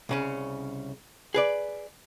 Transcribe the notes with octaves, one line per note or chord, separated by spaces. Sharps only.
C2 C#3 C#4
G#4 B4 D5